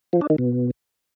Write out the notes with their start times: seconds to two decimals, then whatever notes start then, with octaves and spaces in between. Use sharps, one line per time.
0.13 F3
0.21 D4
0.30 D#3
0.38 B2